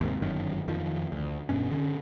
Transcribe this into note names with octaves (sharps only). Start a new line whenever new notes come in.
D#2 G#2 C3
G1 F#2 D#3
F2 D#3 F3
D2
E1 G2 B2 C#4
D3 C#4